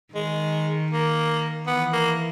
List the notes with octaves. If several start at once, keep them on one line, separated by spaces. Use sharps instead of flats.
D#3 G#3
A#3
E3 B3
A#3